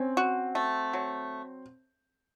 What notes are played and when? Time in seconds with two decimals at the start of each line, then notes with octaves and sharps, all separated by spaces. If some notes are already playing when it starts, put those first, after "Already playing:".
Already playing: C4 C#4
0.17 F#4
0.55 A3
0.93 F#3